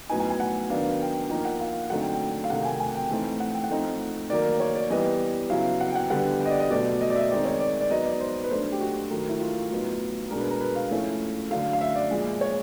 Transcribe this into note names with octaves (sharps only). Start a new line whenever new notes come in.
A2 F#3 B3 D#4 G#5
G#5
G#5
F#5
D#3 F#3 B3 D4 F5
G5
F3 A#3 D#4 G5
F#5
F5
D3 F#3 A3 C4 D#4 F#5
G5
G5
F5
C3 D#3 F#3 A3 F#5
G5
G#5
G#5
G5
A2 E3 A3 C4 D#4
F#5
G5
F#5
F3 A3 C4 D#4
D#3 F#3 A#3 D5
C#5
D5
E3 G3 B3 D#5
C#3 F#3 B3 E4 F5
F#5
G5
F#5
D3 G3 B3 F#5
G5
D#5
D5
D#5
B2 F#3 A3 D5
D#5
D5
E5
D#5
D#3 G#3 C4 D#4 D5
C#5
D5
D5
F#3 B3 D#4 D#5
D5
C5
B4
F#3 A3 D4 C5
G4
F#4
D#3 F#3 A3
E4
F4
A2 F#3 B3 D#4
B2 G#3 B3 D4 A#4
B4
A#4
B4
F5
F3 A3 C#4 E4
D3 F#3 A3 F5
F5
E5
D5
A#2 F3 G#3
C#5